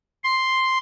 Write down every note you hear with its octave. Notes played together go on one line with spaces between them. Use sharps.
C6